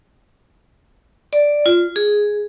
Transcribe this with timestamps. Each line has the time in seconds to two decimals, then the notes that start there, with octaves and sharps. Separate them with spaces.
1.33 D5
1.66 F4
1.96 G#4